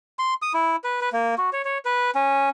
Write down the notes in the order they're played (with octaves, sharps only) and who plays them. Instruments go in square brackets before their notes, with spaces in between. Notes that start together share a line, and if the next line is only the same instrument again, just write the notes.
[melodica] C6
D#6
E4
B4
B4
A#3
F#4
C#5
C#5
B4
C#4